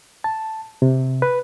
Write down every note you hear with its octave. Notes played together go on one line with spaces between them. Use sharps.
A5
C3
B4